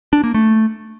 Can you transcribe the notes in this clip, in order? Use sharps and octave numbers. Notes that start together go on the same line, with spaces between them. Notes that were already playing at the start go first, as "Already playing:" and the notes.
D4
A#3
A3